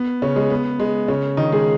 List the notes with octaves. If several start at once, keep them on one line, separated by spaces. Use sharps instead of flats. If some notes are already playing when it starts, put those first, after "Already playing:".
Already playing: B3
C#3 C#4
G#3
B3
G#3
C#3 C#4
D#3 D#4
G#3 G#4